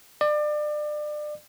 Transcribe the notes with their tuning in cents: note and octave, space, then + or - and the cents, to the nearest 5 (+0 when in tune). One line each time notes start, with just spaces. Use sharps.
D5 +30